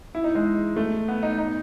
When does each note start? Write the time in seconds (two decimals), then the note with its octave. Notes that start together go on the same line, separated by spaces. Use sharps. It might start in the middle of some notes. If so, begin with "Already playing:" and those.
0.15 E4
0.24 D#4
0.35 G#3
0.76 A3
1.08 B3
1.23 D#4
1.38 D#4